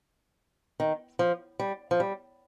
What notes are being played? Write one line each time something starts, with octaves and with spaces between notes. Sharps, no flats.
D#3
F3
G3
F3
G3